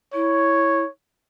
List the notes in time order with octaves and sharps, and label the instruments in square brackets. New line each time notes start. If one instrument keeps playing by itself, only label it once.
[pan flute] E4 [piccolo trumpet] C#5